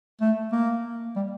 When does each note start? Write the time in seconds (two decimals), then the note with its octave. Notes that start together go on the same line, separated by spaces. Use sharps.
0.21 A3
0.52 A#3
1.16 G3